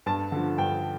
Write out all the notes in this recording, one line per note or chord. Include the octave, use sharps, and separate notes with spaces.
G2 A5
D3 F3
G2 G5